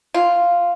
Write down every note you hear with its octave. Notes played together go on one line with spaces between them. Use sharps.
F4